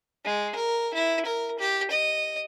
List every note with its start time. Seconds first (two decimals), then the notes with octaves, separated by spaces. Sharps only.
0.25 G#3
0.55 A#4
0.94 E4
1.26 A#4
1.59 G4
1.91 D#5